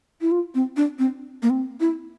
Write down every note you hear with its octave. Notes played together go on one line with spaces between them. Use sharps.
E4
F4
C4
D4
C4
A#3
C4
E4